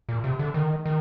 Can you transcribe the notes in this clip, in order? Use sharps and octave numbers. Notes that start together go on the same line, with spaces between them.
A#2
C3
D3
D#3
D#3